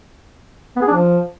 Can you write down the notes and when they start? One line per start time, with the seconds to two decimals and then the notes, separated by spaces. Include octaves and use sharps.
0.76 B3
0.82 G#4
0.87 D4
0.93 F3